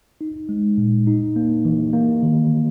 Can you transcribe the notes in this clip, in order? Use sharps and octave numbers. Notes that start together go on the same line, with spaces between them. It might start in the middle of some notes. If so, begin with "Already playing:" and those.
D#4
G#3
A#2
D#4
A#3
E3
A#3
D#3